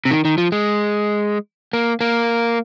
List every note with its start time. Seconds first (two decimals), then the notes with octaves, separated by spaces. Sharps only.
0.05 C3
0.11 D#3
0.25 D#3
0.38 F3
0.52 G#3
1.73 A#3
2.01 A#3